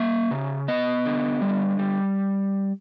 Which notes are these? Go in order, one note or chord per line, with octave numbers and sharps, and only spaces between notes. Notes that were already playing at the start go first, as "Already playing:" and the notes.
Already playing: A#3 E5
C#3
B3 D#5
D3
G3
G3